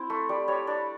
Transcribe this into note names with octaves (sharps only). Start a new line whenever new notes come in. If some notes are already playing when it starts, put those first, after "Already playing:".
Already playing: C4 E4
A3
G3 D5
G3 C#5
D4 D5